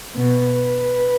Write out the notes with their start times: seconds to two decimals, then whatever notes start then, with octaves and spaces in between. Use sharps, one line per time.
0.16 B2 B4